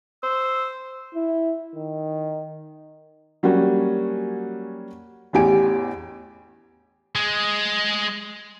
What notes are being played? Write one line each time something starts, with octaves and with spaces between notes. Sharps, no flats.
C5 E6
E4
D#3
F#3 G3 A#3 C#4 F#4
A1 E2 G4 G#5 D7
G#3